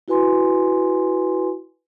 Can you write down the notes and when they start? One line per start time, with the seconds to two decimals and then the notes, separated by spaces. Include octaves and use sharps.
0.08 E4 F#4 B4 G#5 C6